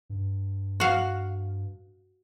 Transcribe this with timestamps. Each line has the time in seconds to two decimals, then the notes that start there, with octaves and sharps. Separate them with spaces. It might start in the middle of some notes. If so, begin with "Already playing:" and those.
0.10 G2
0.80 F#4 F5